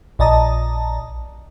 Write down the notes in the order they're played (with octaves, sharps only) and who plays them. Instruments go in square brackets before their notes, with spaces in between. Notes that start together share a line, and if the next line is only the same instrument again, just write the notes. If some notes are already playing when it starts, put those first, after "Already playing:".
[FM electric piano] A#1 D5 D#5 A5 A#5 D#6